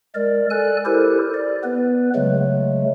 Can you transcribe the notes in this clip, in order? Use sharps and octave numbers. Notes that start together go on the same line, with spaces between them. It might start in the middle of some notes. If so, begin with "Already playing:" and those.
G#3 A#4 D5
A4 D5 G#5 F#6
E4 G4 A4 A#4 C5
D5
B3 B4
C#3 F#3 G#3 A3